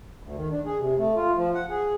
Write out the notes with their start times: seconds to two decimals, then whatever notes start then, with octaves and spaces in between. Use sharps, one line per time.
0.23 D2
0.36 D#3
0.50 D4
0.66 G#4
0.79 C3
0.98 A3
1.16 F4
1.37 F3
1.55 F#5
1.70 G#4